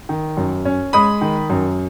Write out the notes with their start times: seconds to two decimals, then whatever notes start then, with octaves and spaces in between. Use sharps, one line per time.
0.09 D#3
0.37 F#2
0.65 C#4
0.93 G#3 B5 D#6
1.21 D#3
1.50 F#2